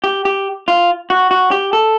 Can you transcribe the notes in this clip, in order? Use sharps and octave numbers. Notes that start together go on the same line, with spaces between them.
G4
G4
F4
F#4
F#4
G4
A4